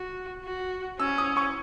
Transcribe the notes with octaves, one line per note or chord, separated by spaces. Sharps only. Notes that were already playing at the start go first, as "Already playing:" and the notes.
Already playing: F#4
F#4
C#4 E6
D#6
C#6